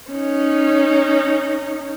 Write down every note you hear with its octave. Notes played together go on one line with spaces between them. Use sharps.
C#4 D#4